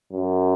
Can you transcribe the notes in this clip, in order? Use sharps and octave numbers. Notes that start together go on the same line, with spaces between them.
F#2